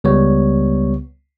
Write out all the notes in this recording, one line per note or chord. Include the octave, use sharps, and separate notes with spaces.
C#2 G3 B3 C#5